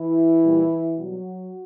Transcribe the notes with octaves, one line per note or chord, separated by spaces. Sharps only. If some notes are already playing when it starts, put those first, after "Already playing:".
Already playing: E3 E4
A#2 G3
B2 F#3 G3 F#4